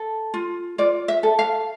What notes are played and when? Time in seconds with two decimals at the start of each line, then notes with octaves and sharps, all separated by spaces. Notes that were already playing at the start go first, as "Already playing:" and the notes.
Already playing: A4
0.34 F4
0.78 F4 D5
1.08 E5
1.23 A4
1.39 F5